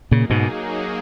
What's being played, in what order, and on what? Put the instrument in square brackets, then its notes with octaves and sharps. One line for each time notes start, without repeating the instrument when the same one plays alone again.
[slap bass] A#2 C#3 [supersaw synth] F#3 A#3 D#4 G#4
[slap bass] G#2 B2